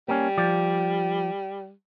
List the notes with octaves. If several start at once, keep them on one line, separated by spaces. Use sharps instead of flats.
G3 A#3 C#4
F3 D5